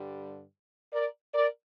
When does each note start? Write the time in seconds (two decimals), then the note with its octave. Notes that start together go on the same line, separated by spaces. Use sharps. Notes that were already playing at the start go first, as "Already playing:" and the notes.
Already playing: G2 D3 G3
0.93 A#4 D5
1.33 A#4 D5